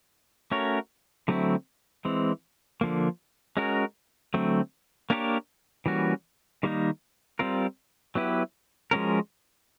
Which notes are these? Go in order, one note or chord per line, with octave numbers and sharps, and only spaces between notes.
A3 C#4 F#4 A#4 C#5
D3 F#3 A3 C4 E4
E3 G#3 C4
D3 F3 A#3
G#3 C#4 F#4 A#4
D3 F#3 A3 C4
A#3 D4 G4 A#4 C#5
E3 G3 A#3 C#4 F#4
D#3 G3 A#3 D#4
G3 C4 F4 A#4
F#3 B3 E4 G4 B4
F3 G#3 C#4 F#4 A#4